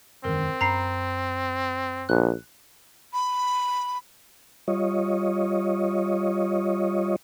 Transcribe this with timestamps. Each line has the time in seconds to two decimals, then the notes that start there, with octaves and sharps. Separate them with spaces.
0.25 E1 F#2 D#3 C4 A#4
0.61 F#2 A#5 B5 C7
2.09 A#1 F#6
3.13 B5
4.68 G3 F4 C#5 D#5